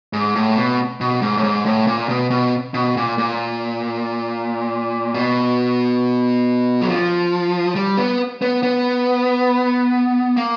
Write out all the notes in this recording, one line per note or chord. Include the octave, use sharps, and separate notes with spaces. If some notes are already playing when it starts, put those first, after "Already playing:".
G#2
A2
B2
B2
G#2
A2
G#2
A2
A#2
B2
B2
B2
A#2
A#2
B2
F#3
F3
G3
B3
B3
B3
A#3